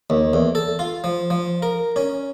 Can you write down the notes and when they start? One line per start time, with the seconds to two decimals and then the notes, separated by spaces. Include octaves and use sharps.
0.10 D#2
0.33 E2
0.55 A4
0.79 F4
1.04 F3
1.30 F3
1.62 A#4
1.96 C#4